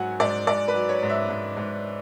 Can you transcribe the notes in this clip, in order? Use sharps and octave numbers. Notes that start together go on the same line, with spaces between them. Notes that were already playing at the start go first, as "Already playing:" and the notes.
Already playing: G#2 F#3 F#5 G#5
G#2 D5
G#2 D5
B4
F#3
C#5
G#2
E5
G#2
G#2